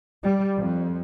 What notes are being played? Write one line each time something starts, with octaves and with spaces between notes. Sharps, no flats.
G3
F2